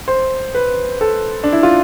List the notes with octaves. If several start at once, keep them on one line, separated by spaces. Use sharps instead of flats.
C5
B4
A4
D4
E4
F4